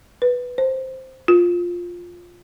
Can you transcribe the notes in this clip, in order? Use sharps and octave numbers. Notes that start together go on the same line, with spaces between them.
B4
C5
F4